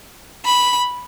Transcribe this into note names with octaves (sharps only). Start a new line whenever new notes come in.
B5